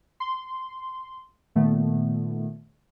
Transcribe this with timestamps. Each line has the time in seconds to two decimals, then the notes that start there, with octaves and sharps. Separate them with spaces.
0.20 C6
1.55 A#2 D#3 A3 B3